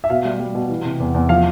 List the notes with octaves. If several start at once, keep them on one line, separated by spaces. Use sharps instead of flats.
E5
B2 F5
G3
G3
B2
E3
C3
E2
E2
F3 F5